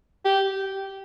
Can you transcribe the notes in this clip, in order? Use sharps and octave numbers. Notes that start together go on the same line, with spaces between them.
G4